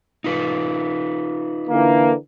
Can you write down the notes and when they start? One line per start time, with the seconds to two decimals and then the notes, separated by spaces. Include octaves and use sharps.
0.24 D#4 F4 B4
1.69 D3 E3 A#3